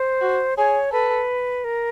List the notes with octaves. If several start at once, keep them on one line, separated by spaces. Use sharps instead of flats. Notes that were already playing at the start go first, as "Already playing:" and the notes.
Already playing: C5
F#4
G#4 C#5
A4 B4
A#4